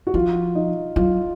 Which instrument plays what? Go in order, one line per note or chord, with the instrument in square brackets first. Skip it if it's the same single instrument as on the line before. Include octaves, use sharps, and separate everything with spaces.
[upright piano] F#4
[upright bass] F3 [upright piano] F4
[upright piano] D#4
[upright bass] F#3 [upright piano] F4